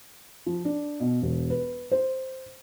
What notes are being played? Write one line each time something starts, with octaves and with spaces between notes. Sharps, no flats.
F3
D4
B2
E1
B4
C5